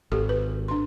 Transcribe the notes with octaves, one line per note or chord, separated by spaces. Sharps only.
G#1 G4 A4
B4
D4 C6